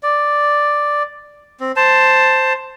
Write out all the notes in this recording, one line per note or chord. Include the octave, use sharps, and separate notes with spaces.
D5
C4
C5 A5